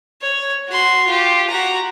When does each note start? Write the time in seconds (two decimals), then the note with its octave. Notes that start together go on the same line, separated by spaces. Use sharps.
0.22 C#5
0.68 F#4 C6
1.07 F4 G4
1.50 F#4 A#5